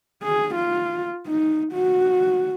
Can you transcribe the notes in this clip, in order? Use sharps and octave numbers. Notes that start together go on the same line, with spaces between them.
G#4
F4
D#4
F#4